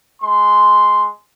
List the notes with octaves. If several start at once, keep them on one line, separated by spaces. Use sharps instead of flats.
G#3 C6